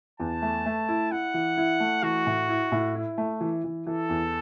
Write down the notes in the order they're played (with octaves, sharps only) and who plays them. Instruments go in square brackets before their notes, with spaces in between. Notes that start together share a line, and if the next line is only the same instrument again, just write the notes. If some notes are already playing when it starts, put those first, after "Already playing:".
[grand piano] E2 [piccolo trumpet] A5
[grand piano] A3
A3
E4
[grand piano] E4 [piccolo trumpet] F#5
[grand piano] E3
E4
A3
[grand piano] E3 [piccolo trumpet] F#4
[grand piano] A2
E4
A2
E4
A3
E3
E3
[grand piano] E3 [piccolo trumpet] A4
[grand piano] E2